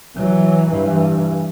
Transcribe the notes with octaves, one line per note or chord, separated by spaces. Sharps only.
E3 F#3
G2 E3